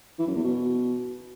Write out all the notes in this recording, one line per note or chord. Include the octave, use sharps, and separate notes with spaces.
E3
F#2
E2
B2